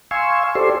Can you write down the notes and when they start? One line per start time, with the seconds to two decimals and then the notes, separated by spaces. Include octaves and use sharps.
0.11 F5 G#5 C6 C#6 E6
0.55 G4 A4 C5 D5 C6